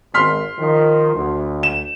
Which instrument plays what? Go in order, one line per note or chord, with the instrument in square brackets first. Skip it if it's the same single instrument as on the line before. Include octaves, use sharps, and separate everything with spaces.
[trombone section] G#1 [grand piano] C6 F6 B6
[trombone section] D#3 F3
D2
[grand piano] E7